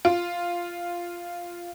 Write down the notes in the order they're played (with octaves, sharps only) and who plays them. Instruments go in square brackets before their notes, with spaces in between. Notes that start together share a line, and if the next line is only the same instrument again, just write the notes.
[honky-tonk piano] F4 [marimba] F5